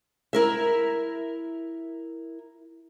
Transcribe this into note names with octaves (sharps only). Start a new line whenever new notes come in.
E4 A#4 E5